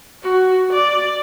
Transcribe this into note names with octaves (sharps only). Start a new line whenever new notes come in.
F#4
D5